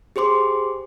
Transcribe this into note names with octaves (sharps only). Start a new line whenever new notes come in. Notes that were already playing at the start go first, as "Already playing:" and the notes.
G4 G#4 C5 C6 D6